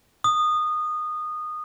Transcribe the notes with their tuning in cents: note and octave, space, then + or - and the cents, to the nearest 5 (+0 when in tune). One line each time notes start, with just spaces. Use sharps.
D#6 -20